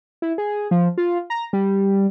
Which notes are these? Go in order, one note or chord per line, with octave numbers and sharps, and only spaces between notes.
E4
G#4
F3
F4
A#5
G3